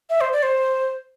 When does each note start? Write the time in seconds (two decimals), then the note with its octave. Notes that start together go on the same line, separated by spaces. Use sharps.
0.10 E5
0.21 C5
0.33 D5
0.43 C5